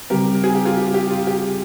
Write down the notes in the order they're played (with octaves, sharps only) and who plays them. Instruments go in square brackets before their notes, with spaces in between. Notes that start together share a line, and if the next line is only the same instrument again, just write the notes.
[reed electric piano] C#3 G3 C4 [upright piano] G4 A#4
[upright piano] G#4
G4
F4 G#4
G4
G4
F4
G4